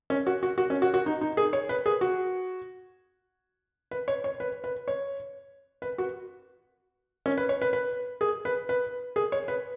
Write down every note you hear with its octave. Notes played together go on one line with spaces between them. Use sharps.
C#4
F#4
F#4
F#4
C#4
F#4
F#4
D#4
D#4
G#4
C#5
B4
G#4
F#4
B4
C#5
C#5
B4
B4
C#5
B4
F#4
C#4
B4
C#5
B4
B4
G#4
B4
B4
G#4
C#5
B4